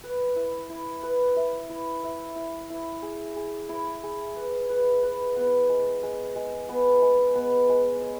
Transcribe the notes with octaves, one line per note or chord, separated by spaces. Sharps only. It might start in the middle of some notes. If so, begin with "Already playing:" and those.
B4
E4
E4
B4
E5
E4
E5
E4
E4
G#4
G#4
E4
G#4
B4
B4
B4
B3
G#3
G#3
G#3
B3
G#3
B3
G#3
C#5